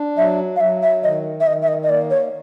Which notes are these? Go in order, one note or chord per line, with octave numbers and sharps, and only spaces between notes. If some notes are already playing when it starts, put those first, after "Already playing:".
Already playing: D4
F#3 E5
F5
F#3 E5
E5
D#3 D#5
E5
D#3 D#5
E5
D#5
D#5
A#3 D5
C#5